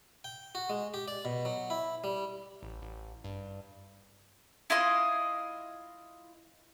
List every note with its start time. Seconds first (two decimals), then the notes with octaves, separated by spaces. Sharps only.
0.24 G5
0.55 F#4
0.70 G#3
0.94 G4
1.08 D5
1.25 B2
1.45 F#3
1.70 E4
2.04 G3
2.63 A1
2.82 A1
3.24 G2
4.70 E4 F4 D#5 C6